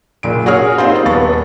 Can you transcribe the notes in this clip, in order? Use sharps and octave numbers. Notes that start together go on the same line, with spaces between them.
F#1 A#2 D7
F#4 G#4 C#5 F6
A#3 C4 D#4 F4 G4 C5
D#1 B3 C#6 A6